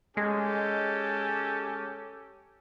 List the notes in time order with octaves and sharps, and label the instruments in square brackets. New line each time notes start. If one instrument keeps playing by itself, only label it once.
[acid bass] G#3 [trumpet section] C#4 G4 A4